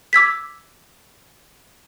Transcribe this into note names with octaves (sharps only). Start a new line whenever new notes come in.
D6 E6 G#6 B6